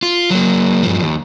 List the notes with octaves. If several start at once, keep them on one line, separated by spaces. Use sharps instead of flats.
F4
F#3 A#3
G2 F3
D#2